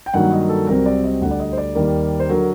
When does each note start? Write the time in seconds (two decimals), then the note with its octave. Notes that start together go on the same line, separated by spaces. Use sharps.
0.06 G5
0.14 G2 D#3 F#3 A#3 F#5
0.32 D#5
0.49 A4
0.67 C2 C3 F#3 C4 A#4
0.86 D5
1.04 D#5
1.22 D2 D3 G3 F#5
1.31 D5
1.40 D#5
1.53 C5
1.58 D5
1.75 D#2 D#3 G3 A#3
2.20 C5
2.29 D3 F#3 A#4